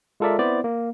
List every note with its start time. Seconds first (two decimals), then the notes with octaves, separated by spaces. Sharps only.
0.20 G#3 F4 A4 A#4 D5 E5
0.39 B3 C4 E4 C5 D5
0.64 A#3